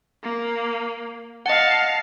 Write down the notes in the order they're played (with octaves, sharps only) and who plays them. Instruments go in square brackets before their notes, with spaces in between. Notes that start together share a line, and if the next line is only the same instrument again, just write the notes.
[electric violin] A#3
[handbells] D#5 F#5 [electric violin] F5 A5